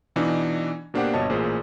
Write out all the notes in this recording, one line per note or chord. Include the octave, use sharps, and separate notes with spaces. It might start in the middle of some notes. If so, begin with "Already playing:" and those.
B2 E3 D4 D#4
B2 A#3 D4 G4 C5 F#5
G1 B2 C#5 D#5 A5
A1 A#2 G#4 C5